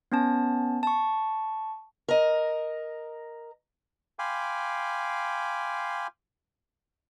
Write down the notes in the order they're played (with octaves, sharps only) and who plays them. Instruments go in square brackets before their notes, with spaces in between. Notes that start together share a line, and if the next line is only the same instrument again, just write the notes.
[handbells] B3 C#4 A5
A5 C#6
[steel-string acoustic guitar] A#4 D#5
[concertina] F5 G5 G#5 B5 C6 D6